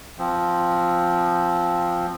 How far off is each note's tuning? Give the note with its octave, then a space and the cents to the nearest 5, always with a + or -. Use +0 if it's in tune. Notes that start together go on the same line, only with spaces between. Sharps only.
F3 +0 C4 +0